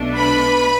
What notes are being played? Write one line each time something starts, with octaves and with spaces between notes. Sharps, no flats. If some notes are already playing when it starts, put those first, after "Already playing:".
Already playing: B1 B2 A3 D4
B4 B5